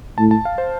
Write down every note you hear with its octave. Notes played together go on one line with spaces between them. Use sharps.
A2 A5
A5
F5
C5